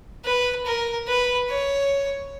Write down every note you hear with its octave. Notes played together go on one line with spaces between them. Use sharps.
B4
A#4
B4
C#5